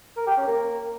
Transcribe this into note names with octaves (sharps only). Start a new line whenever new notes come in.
A#4
G4
C#4
A#3